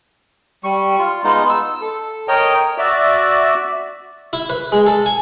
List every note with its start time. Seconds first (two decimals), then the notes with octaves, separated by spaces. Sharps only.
0.64 G3 C#6
0.99 F4
1.24 G#3 B3 D#4 F4
1.49 E6
1.82 A4
2.28 A#4 C#5 D#5 G5
2.78 F#4 D5 E5
4.33 E4
4.50 B4
4.72 G#3
4.87 A4
5.06 G#5